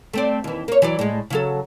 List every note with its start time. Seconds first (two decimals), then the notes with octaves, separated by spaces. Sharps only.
0.13 A3 C4 D5
0.44 D#2 E3
0.68 A#3 C#5
0.82 E3 F#3 D5
0.99 A2 G#3
1.30 C#3 F#3 A4